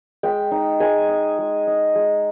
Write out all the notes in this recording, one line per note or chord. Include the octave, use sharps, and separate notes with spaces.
G#3 G5
D#4
G#3 G#5
D#4
G#3
D#4
G#3